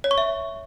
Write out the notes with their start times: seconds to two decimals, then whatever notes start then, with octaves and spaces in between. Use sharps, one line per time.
0.04 C#5
0.11 C#6
0.18 E5